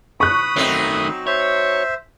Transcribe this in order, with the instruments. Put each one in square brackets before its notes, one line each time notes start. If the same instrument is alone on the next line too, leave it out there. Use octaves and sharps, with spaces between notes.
[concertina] B5 D#6 [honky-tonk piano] C#6 F#6
[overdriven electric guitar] D#3 A3 [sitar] F#3 C4 D#4
[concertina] C5 E5 [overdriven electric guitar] C#5